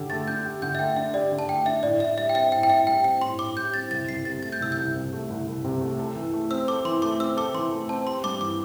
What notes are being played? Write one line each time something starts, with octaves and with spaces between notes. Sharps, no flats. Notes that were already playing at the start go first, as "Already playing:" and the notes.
Already playing: D3 G4
A3 A6
D4 G6
G4
D3 G6
E5
A3 G5
D4 E5
G4 D5
D3
A5
A3 G5
D4 E5
A2 D5
A2 E5
G3 E5
G5
C4 E5
A2 G5
G5
A2 E5
G3 G5
C4 G5
A2 C6
A2 D6
G3 G6
C4 A6
C2 A6
C2 C7
C3 A6
A3 A6
G6
C2 E6
C2 G6
C3
A3
C2
C2
C3
A3
A4
E3
A3
C4 E6
A4 D6
E3 C6
A3 D6
C4 E6
A4 D6
E3 C6
A3
C4 A5
G4 C6
G2 D6
E3 D6